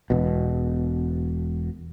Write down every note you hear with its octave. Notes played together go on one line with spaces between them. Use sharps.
E1 B2